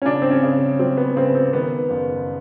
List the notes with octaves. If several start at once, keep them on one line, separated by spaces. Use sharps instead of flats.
C#4
C#3 D4
C4
C#4
C#3
F#3 C4
B3
C#3 C4
C4
D#3 B3
F#1